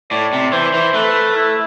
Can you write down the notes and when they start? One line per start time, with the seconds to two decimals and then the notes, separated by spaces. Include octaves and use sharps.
0.11 A2 D5
0.33 C3
0.53 E3 C5
0.74 E3
0.94 A3 B4
1.35 E4